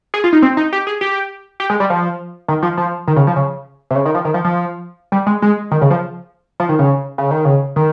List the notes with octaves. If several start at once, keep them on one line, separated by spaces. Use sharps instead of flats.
G#4
F4
D#4
C4
D#4
G4
G#4
G4
G4
G#3
G3
F3
D#3
F3
F3
D#3
C#3
F3
C#3
C3
C#3
D#3
F3
D#3
F3
F3
G3
G#3
G#3
D#3
C#3
F3
F3
D#3
C#3
C#3
D#3
C#3
D#3